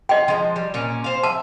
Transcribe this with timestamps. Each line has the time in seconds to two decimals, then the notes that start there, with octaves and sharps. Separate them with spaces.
0.09 F4 D#5 G5
0.28 F3 G#3
0.56 G3
0.74 A#2 C#4
1.04 C5 F5
1.23 E5 A5